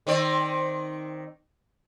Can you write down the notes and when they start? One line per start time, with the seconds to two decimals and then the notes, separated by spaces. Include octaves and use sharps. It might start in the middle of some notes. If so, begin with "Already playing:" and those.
0.07 D#3 C4 D5